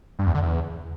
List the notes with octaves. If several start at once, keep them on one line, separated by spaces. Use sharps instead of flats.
G2
E2
D3
E2